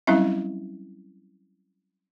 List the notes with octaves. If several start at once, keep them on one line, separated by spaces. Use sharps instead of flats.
F#3 G3 C4 C#4 E4 E5